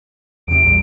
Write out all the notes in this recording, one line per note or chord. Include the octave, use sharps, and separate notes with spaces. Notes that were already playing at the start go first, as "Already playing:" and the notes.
E2 C3 D7
A#1 E2 G2